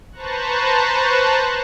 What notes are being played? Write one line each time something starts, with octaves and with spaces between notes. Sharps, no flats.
B4 C5 A5 A#5 C#6 F#6